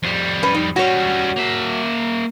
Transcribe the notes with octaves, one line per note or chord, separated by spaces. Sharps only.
F2 G3
C#4 B4
D#4
G3 C#4 F#4 C#5
A#3 E5